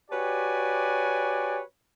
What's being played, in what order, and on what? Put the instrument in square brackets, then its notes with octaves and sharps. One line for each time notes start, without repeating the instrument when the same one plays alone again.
[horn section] F#4 G4 B4 C#5 D5 G#5